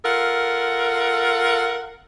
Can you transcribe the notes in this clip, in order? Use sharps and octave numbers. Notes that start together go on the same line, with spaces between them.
F4 A4 A#4 F#5